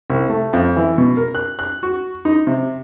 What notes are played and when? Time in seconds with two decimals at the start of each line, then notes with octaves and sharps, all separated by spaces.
0.10 C2
0.30 A3
0.53 F2
0.76 E3
0.98 B2
1.17 A#4
1.35 F#6
1.59 F#6
1.83 F#4
2.25 D#4
2.47 C3